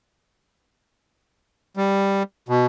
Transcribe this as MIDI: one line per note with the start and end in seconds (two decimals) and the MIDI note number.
1.77 2.23 55
2.49 2.66 47